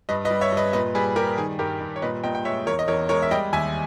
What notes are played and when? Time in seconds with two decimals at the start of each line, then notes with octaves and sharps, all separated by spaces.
0.09 G2 B4 D#5
0.25 B4 D#5
0.30 G3
0.41 C#5 E5
0.52 G2 B4 D#5
0.73 A#2 B4 D#5
0.95 G3 G#4 B4
1.16 G3 G4 A#4
1.37 D#3 G#4
1.59 G2 G4 A#4
1.80 G2
1.96 C#5
2.02 A#2 B4 D#5
2.23 A#2 D#5 G5
2.35 G5
2.45 G#3 C#5 E5
2.66 E2 A#4 C#5
2.79 D#5
2.88 E2 A#4 C#5
3.09 G#3 A#4 C#5
3.22 E5
3.31 G3 D#5 G5
3.53 D#2 E5 G#5